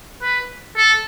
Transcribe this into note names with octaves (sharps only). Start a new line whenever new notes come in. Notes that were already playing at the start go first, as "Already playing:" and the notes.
B4
A4